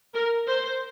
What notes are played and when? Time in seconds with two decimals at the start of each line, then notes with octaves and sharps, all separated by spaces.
0.13 A#4
0.47 C5